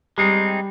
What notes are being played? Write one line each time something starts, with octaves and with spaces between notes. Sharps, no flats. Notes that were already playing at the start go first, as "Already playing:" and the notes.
G3 G#3 C4 D#4